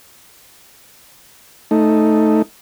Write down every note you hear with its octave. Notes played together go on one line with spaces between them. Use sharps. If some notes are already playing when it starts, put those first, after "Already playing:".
A3 D#4